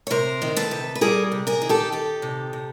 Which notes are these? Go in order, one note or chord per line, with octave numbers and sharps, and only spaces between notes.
C#5
C3 A#4 C5
D#3
A4 B4
C3
B4
G3 G#4 A#4
C3
G#4 A#4
D#3
G4 A4
D#3 G4 A4
C3
C3